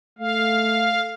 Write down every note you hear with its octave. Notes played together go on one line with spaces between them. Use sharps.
A3 F5